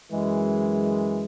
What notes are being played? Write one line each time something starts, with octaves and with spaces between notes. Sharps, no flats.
F#2 E3 G#3